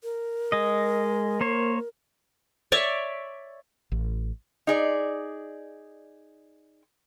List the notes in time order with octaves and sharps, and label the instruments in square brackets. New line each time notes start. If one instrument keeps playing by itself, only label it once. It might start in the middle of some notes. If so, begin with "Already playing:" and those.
[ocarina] A#4
[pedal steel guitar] G#3 D#5
A#3 C5 C#5
[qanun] C#5 D5 E5 C#6
[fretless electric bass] A1
[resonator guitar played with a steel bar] D#4 G#4 D5